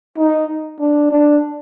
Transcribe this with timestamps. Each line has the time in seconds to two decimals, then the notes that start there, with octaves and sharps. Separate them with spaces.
0.18 D#4
0.80 D4
1.11 D4